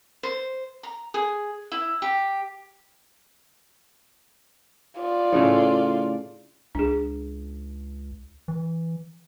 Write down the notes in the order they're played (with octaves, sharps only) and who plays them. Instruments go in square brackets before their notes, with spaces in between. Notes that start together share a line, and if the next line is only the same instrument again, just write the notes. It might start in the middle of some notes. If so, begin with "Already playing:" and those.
[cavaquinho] C5
A#5
G#4
E4
G4
[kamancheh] F4 D5
[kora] A2 C#3 A3
[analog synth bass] C#2 [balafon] D4 G#4
[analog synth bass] E3